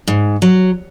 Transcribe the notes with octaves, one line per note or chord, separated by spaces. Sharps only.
G#2
F#3